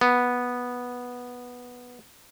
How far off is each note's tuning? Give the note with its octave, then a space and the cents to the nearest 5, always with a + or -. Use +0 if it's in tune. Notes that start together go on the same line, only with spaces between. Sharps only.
B3 -10